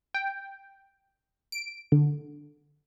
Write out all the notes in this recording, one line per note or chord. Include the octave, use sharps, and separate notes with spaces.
G5
D7
D3